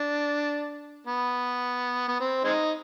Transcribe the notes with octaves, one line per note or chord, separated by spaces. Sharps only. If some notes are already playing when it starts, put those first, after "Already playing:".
Already playing: D4
B3
B3
C4
G#3 C4 D#4